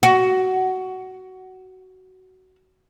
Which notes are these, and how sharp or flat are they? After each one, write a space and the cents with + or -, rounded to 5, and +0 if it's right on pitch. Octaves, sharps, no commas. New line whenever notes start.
F#4 +15